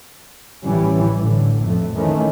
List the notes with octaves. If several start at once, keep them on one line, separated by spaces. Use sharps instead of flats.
A1 E3 G3 C#4
A2 D3
F2 A3
D#3 E3 A3 C#4